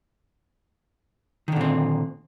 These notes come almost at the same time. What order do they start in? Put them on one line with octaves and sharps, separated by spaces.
D#3 D3 A#2 C4